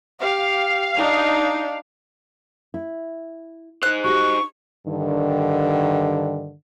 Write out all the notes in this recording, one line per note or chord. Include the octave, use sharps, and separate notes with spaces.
G4 F5
D4 D#4
E4
D#4 C5 F#6
F#4 G4 D#5 C#6
G2 D3 D#3